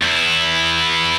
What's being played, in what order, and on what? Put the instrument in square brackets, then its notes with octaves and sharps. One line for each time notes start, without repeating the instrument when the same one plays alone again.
[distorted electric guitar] E2 E4